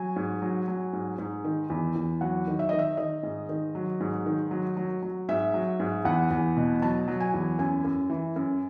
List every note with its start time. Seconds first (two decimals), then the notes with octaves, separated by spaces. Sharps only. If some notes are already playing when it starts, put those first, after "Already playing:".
Already playing: F#3 G#5
0.16 G#2
0.42 F#3
0.68 F#3
0.93 G#2
1.18 G#2
1.44 D#3
1.70 E2
1.95 E2
2.21 F#3 F#5
2.47 D#3
2.59 E5
2.69 D#3 D#5
2.79 E5
2.97 D#3 D#5
3.23 G#2
3.49 D#3
3.75 F#3
4.00 G#2
4.26 D#3
4.51 F#3
4.77 F#3
5.02 F#3
5.29 G#2 E5
5.54 F#3
5.80 G#2
6.05 E2 F#5
6.31 E2
6.57 B2
6.82 F#3 A5
7.08 F#3
7.20 G#5
7.34 E2
7.59 F#2 G#5
7.84 F#2
8.10 E3
8.36 F#2